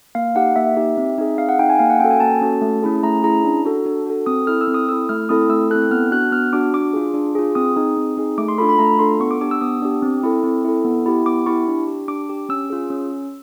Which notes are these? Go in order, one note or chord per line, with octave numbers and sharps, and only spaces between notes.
A#3 F5
D#4 G4 F#5
A#3 E5
D#4 G4
C4
D#4 G#4
C4 F5
F#5
D#4 G#4 G5
G#5
A#3 F5
F#5
C#4 F#4 A4 G5
G#5
A#3 A5
C#4 F#4 A4
A3
C#4 E4 G#4
A3 A#5
C#4 E4 G#4 A#5
D4
F#4 A4
D4
F#4 A4
C4 D#6
E4 A4 F6
E6
C4
D#6
E4 A4 E6
A3 F6
C4 E4 A4 D#6
A3 E6
C4 E4 A4 F#6
B3 F6
D4 F#4 F#6
B3 F6
D4 F#4 D6
D4 D6
F4 G#4
D4
F4 G#4
C4 D#6
D#4 G#4
C4
D#4 G#4
A3 D6
C6
D4 F4 A4 B5
B5
A3 A#5
D4 F4 A4 C6
B3 C#6
D6
D4 G4 D6
E6
B3 D#6
D4 G4
C4
E4 A4
C4
E4 A4
B3
E4 G4
B3 D6
E4 G4 C#6
D4
G4
D4 D6
G4
C#4 E6
F4 G#4
C#4